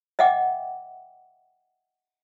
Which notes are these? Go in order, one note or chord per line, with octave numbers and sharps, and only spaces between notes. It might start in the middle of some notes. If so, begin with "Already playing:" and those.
D#5 E5 F#5 G5 D6